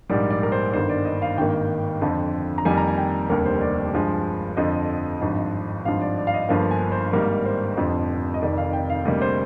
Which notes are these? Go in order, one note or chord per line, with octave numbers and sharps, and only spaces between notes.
A#1 G#2 G3 A#3 D5
D5
A#4
C5
G1 G2 D#3 A#3 C5
D5
D#5
F5
G#1 G2 D#3 A#3 G5
F2 D3 F3
A#5
F2 D#3 G3 A#3 G#5
A#5
G#5
G5
F1 D#2 D3 G3 A#3 A#4
C5
D5
G2 F3 G#3
F2 D3 F3 D#5
G#1 G2 F3
G#1 G2 F3 F5
D5
D5
F5
D#5
G1 G2 F3 A#3 F5
G#5
C5
G#1 G#2 G3 A#3 A#4
C5
F1 F2 D3 F3
D#5
F1 F2 D#3 D5
F5
G5
F5
D2 C3 G3 A#3 D#5
C5